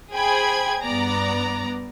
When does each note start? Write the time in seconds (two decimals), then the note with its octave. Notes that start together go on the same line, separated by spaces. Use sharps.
0.12 G#4 C5 G5 G#5 B5 G#6
0.81 G2 B3 D5 A#5